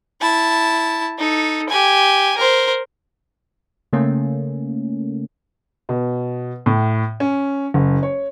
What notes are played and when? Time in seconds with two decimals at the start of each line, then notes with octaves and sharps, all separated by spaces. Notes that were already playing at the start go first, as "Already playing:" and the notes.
0.21 E4 A5
1.18 D#4 A4
1.69 G4 G#5
2.37 A#4 C5
3.93 C#3 A3 A#3 C#4
5.89 B2
6.66 A2
7.20 C#4
7.74 F#1
8.03 C#5